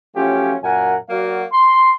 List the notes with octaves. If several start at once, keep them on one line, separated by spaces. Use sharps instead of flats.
F3 F#3 A3 C#4 F4 G4
F#2 A#2 A#4 F#5 G#5
F#3 A#3 F#4 D5 F5
C6